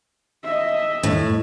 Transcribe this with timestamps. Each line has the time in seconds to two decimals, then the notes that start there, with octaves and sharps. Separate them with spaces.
0.44 D#5 E5
1.03 A2